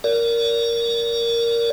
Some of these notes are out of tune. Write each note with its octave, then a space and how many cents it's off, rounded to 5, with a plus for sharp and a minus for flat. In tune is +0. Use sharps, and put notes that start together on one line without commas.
A#4 +0 D5 -30